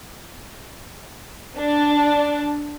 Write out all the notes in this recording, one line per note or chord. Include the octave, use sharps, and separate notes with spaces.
D4